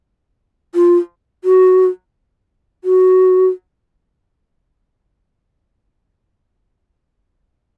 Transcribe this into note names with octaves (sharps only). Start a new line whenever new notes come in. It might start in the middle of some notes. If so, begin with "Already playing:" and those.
F4
F#4
F#4